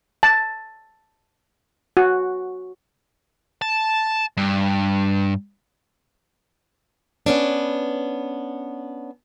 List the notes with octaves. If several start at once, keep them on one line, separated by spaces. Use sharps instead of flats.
A5
F#4
A5
G2
B3 C#4 D4